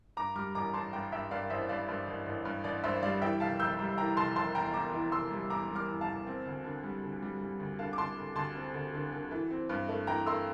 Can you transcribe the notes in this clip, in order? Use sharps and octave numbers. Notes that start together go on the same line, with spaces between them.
G2 A#5 D6
G3 D6 F6
A1 A#5 D6
A1 A5 C6
G2 G5 A#5
G2 E5 G5
G2 D5 F5
A1 C5 E5
G2 D5 F5
G2
A1
A1
G2
A1 D5
G2 C5 E5
G3 D5 F5
E3 E5 G5
F1 F5 A5
F1 E6 G6
G3
E3 G5 A#5
F1 A5 C6
F1 A5 C6
E2 G5 A#5
E2 A#5 D6
E3
F1 C6 E6
G3
E2 A#5 D6
G3
D6 F6
E2
F5 A5
E2
C4
D2
D3
G3
D3
G3
G3
D2
D3 F5 A5
D6
D3 A5 C6
D2
D2 A5 C6
C4
D2
D3
D3
E3
C4
G2
A3
E3 G5 A#5
A3 C6 E6